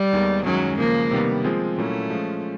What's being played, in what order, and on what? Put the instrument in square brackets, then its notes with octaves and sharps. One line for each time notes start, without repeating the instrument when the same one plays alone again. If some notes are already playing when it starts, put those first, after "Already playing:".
Already playing: [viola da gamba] G3
[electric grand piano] D#2 D#3 G#3 B3 D#4
[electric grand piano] F#2 D#3 G#3 C#4 [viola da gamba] F#3
[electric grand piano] C#3 F3 G#3 [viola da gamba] A#3
[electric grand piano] C3 D#3 G3 B3
F3 G#3 C4 F4 G#4
[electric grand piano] A#2 F#3 A#3 C#4 E4 [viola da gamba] A3
[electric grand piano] F3 G#3 C#4 F4